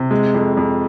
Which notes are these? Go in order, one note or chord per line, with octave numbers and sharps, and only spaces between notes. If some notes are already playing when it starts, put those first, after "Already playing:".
Already playing: C3
G#3
F2
F2